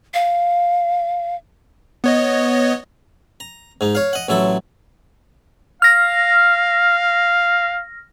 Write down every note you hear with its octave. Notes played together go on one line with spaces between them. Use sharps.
F5
B3 C#5 D#5
A#5
G#2 D#4
C#5 F5
D#5 F#5
A1 F#3 E4 A4
F5 F6 A#6